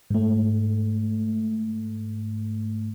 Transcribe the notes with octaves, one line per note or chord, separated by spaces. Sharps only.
G#2 A3